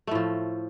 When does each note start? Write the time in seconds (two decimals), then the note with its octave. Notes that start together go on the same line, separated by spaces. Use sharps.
0.07 A3
0.11 A2
0.15 F3